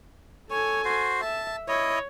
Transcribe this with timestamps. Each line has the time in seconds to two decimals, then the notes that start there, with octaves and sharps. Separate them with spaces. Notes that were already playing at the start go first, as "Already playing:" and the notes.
0.50 A4 C#5 G#5
0.85 F#4 C5
1.22 E5 A5
1.68 E4 C#5 D#5